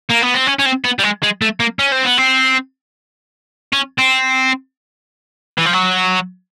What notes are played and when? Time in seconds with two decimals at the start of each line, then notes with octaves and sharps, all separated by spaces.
0.10 A#3
0.22 B3
0.34 C4
0.47 C#4
0.59 C#4
0.66 C4
0.85 B3
0.99 G3
1.04 G#3
1.23 G#3
1.42 A3
1.60 A#3
1.79 C#4
1.92 C4
2.05 B3
2.17 C4
3.73 C#4
3.98 C4
5.58 E3
5.65 F3
5.73 F#3